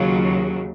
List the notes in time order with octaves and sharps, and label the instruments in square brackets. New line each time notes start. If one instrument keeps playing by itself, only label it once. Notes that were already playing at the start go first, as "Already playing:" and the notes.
Already playing: [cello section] D#2 C#3 F#3 F4